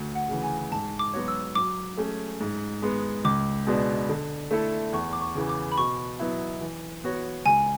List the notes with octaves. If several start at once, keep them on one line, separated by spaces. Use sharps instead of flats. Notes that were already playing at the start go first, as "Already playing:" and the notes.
Already playing: D2
F#5
C#3 E3
G#5
G#2 A5
D6
F#3 B3 F#4 C#5
E6
F#3 D6
A3 C#4 G#4
G#2
G#3 B3
C#2 D6
B2 G#3 B3 D4
D3
A3 E4 A4
E2 C#6
D6
C#6
C#3 E3
D6
B5
B2 C#6
F#3 B3 E4
E3
B3 F#4 C#5
C#2 G#5